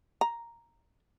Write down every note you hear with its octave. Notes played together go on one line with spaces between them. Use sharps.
A#5